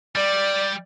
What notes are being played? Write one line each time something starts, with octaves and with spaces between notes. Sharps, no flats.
G3 D5